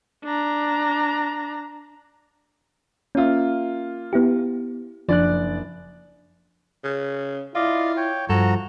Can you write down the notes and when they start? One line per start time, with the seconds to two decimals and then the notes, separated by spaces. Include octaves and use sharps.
0.24 D4 A#5
3.15 A#3 C#4 F4 E5
4.13 B3 E4 G4
5.09 F#1 F3 D4 D5 F#6
6.84 C#3
7.55 E4 F4 D5 D#5 F5
7.97 C#5 G5
8.29 G2 F3 F#4 A4 A#5